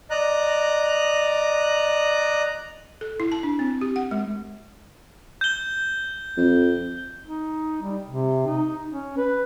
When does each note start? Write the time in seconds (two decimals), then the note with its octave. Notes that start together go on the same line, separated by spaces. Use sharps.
0.10 D5 D#5 A#5 F#6
3.01 A4
3.20 E4
3.32 A5
3.43 D4
3.59 C4
3.81 G4
3.96 F#5
4.11 G#3
5.41 G6 G7
6.37 F2
7.26 D#4
7.82 G3
8.07 C3
8.47 D#4
8.89 C#4
9.17 B4